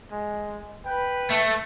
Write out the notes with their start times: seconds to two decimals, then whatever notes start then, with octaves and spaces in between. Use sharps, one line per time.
0.11 G#3
0.85 B4 G5
1.30 A3